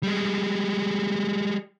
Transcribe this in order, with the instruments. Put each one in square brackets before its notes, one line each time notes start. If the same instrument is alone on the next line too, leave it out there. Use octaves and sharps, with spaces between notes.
[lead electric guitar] G3 G#3